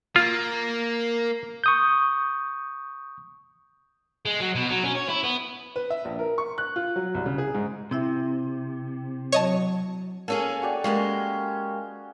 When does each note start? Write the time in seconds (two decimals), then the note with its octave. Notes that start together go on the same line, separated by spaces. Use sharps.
0.16 A#3 F4
1.64 C#6 D#6 G6
4.25 G#3
4.40 F#3
4.55 B2
4.69 F#3
4.83 C#4
4.95 C#5
5.09 E4
5.23 B3
5.76 B4
5.90 E5
6.05 A#1
6.19 A#4
6.38 C#6
6.58 F#6
6.76 F4
6.96 F#3
7.15 C2
7.26 C#3
7.38 G#4
7.55 G#2
7.91 C3 C4 E4 E5
9.32 F#3 C#5 D#5 A5
10.28 A#3 C#4 G#4 A4
10.62 F#4 G4 D5
10.84 G#3 A#3 C#4 G4 G#4